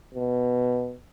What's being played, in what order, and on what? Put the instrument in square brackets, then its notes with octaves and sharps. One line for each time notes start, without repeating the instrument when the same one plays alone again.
[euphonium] B2